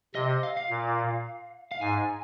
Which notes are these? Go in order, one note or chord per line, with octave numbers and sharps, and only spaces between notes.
C3 D#5
D#5
F5
F5
A#2
F5
G#2 G#5